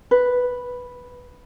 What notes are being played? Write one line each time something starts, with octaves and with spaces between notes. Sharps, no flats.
B4